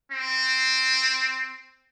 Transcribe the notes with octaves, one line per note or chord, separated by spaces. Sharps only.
C4